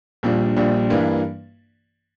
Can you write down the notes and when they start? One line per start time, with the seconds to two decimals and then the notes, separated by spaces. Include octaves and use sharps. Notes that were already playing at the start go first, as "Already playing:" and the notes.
0.23 A#1 A#2 G3 D4
0.56 A#1 A#2 G3 D4
0.90 G2 E3 A#3 D4